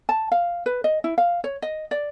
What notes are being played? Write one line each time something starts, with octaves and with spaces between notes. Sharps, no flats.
A5
F5
B4
D#5
E4
F5
C#5
D#5
D5